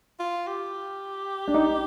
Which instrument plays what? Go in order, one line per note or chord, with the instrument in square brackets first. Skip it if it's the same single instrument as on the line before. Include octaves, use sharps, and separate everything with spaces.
[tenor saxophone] F4
G4
[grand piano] D4
D#4